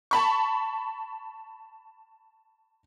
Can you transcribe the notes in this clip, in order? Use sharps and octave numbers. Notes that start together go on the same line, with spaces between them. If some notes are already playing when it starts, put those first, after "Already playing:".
A5 B5 C#6